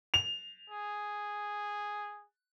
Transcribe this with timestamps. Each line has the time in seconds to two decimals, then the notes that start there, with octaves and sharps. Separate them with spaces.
0.14 F7
0.70 G#4